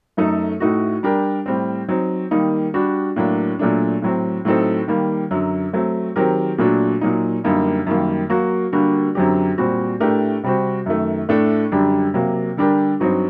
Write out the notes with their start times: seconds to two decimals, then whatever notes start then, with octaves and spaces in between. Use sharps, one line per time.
0.17 F#2 F#3 A3 D#4 A4
0.60 A2 A3 D#4 F#4
1.03 G3 D4 G4 A#4
1.46 A2 G3 C4
1.88 F#3 C4 D#4
2.31 D#3 G3 A#3 D#4
2.74 G3 D4 F#4
3.16 A2 F#3 A#3 D4
3.59 A#2 F#3 A3 D4
4.02 A2 F#3 C4
4.45 A2 F#3 C4 D#4 A4
4.88 D#3 G3 A#3
5.31 F#2 D3 F#3
5.73 F#3 A3 C4
6.16 D#3 F#3 C4 G4 A#4
6.58 A#2 F#3 A3 D4 F#4
7.01 A#2 F#3 A#3 D#4
7.44 F#2 D3 G3 A#3 D#4
7.86 F#2 D#3 G3 A#3
8.30 F#3 A#3 F#4
8.72 D3 G3 A#3 D4 F#4
9.15 F#2 D3 F#3 C4 G4
9.58 A#2 G3 C4 F#4
10.00 A2 A3 D4 G4 A#4
10.43 C3 G3 C4 F#4
10.86 F#2 D#3 A3
11.29 A2 A3 D4 A4
11.72 F#2 D3 G3 D4 G4
12.14 C3 F#3 A#3
12.57 D3 G3 D4 G4 A#4
13.00 G2 F#3 C4 D#4 F#4